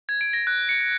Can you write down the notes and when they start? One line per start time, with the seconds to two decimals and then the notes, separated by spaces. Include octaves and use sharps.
0.09 G#6
0.21 D7
0.33 A#6
0.47 F#6
0.69 C#7